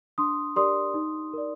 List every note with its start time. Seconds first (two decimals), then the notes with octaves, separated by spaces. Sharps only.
0.18 D4 C6 D#6
0.56 G4 A#4 D5 C6 D#6
0.94 D#4
1.33 A#4 D5